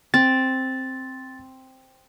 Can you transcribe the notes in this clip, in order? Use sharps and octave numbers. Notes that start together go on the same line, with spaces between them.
C4 A6